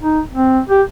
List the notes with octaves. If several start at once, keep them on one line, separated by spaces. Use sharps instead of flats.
D#4
C4
G4